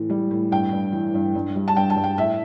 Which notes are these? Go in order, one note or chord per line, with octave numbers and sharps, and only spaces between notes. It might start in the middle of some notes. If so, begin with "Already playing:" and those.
Already playing: A2 E3
G3
A2
G2 G5
G2
E3
G2
G2
G3
A5
G2 G5
A5
G2
G5
A2 E5